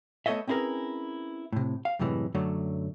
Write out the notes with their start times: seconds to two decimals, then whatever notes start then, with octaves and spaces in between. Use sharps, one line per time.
0.26 A3 B3 A4 C#5 D#5 E5
0.47 C4 C#4 E4 G#4 A#4 B4
1.53 A2 C3
1.85 F5
1.99 F#2 A2 C3 E3 G#3
2.35 F#2 D3 F#3 A3